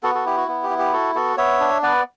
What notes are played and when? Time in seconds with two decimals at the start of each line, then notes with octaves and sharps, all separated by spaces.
0.03 B3 F#4 A4
0.15 F#4 A4
0.26 E4 G4
0.37 F#4
0.48 B3
0.63 G4
0.70 E4
0.79 G4
0.93 F#4 A4
1.15 B3 F#4 A4
1.37 B3 C#5 E5
1.60 D4
1.82 B3 B4 D5